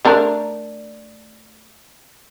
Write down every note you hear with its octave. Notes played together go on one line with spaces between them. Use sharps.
A3 D4 A#4